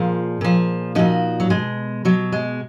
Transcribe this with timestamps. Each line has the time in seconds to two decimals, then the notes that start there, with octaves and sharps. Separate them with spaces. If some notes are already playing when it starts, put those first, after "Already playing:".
Already playing: A#2 F3 G#4
0.41 A#2 F3
0.95 A#2 F3 D#4 F#4
1.40 F#3
1.50 B2 G#3
2.05 B2 F#3
2.32 G#3